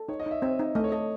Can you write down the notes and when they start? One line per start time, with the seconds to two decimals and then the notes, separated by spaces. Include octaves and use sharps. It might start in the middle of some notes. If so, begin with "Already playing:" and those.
Already playing: A4
0.09 D#4 C#5
0.20 D#5
0.26 D#4
0.31 E5
0.42 C4 E5
0.59 D#4
0.75 A3 D#5
0.84 C#5
0.92 A4 D#5